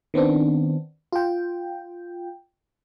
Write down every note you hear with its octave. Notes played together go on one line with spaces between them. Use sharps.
D#3 B3 C4 D4
F4 G5